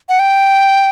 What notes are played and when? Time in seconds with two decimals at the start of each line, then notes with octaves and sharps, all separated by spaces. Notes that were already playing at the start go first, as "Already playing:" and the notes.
0.09 F#5
0.19 G5